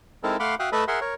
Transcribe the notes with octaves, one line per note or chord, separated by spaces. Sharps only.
G#3 C4 D#4 E4 A4 A#4
A3 F5 F#5 B5 C6 D6
F#4 E5 F5 G5 D#6 F#6
A3 A4 B4 D#5 E5 B5
G#4 A#4 E5 F#5 C6
A#4 C#5